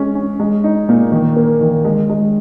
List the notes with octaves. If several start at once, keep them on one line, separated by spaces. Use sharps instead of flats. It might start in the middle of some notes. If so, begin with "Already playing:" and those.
Already playing: G#3 C#4
C#4
G#3
D#4
A#2
D#3
A#3
D#3
G#3
G#3